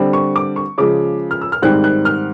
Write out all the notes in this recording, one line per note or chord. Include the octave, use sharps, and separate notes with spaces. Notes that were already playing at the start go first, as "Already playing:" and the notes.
Already playing: D3 G3 C4
C#6
D6
C#6
C#3 F3 G#3 D6
F6
E6
F6
G#2 D#3 G3 C4 F#6
F#6
F6